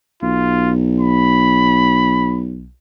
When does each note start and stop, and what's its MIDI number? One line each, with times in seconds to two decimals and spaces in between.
0.23 2.71 35
0.23 0.72 65
1.00 2.40 83